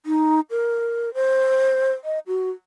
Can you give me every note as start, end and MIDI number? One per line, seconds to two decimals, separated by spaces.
0.06 0.40 63
0.50 1.13 70
1.14 1.92 72
2.04 2.19 75
2.27 2.50 66